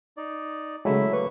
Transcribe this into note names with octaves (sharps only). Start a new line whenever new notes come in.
D#4 D5
C#3 F#3 G#3 A3 E4 E5
A#3 B4 C#6